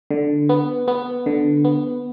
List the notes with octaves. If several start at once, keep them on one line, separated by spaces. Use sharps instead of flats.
D3
B3
B3
D3
B3